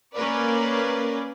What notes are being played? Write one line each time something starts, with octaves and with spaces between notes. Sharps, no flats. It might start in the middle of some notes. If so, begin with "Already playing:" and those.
A#3 C#4 A#4 B4 D5